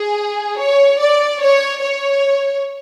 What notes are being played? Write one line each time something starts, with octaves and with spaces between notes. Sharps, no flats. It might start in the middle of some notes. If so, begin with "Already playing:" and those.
Already playing: G#4
C#5
D5
C#5
C#5